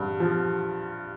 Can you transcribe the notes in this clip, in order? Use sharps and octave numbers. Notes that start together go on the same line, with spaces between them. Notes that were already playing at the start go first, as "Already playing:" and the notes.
Already playing: G2
F3